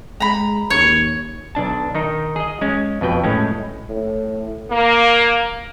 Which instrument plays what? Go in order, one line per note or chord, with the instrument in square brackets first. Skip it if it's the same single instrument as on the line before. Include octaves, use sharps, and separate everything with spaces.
[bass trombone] G#3 [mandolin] A#5 B5
[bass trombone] D#2 [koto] C#5
[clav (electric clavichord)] B1 D4 A5
D#3 D#4
G#4 D#5
G#3 C#4
F2 B2 B4 G5
A2 G#3 C#4
[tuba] A2
[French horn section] A#3